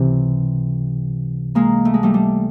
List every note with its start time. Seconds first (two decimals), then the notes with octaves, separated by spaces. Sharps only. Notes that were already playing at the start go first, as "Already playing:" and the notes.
Already playing: C#2 C3 E3
1.55 G#3 A#3
1.85 A3
1.94 G#3
2.03 G3 A3
2.14 G3